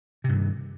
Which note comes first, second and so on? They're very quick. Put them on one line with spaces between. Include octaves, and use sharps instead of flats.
C3 G2 D#3